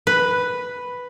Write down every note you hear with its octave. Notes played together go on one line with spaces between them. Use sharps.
B4